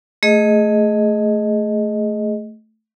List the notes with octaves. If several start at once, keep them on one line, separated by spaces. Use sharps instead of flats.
A3 G#4 D#5